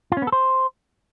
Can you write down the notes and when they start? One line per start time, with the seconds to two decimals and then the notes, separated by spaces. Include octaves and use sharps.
0.12 F4
0.17 C#4
0.22 B3
0.27 A4
0.32 C5